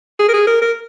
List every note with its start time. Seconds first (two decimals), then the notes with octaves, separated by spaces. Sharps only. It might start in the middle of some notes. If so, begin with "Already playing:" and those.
0.19 G#4
0.29 A#4
0.34 G#4
0.47 A#4
0.62 A#4